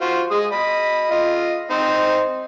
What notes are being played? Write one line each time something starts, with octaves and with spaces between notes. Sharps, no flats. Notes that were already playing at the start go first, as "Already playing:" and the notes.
F4 F#4 C5
G#3 D#6
D#5 B5
F4 D#5
C4 D#4 C5